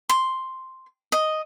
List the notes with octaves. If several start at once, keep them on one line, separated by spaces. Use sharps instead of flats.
C6
D#5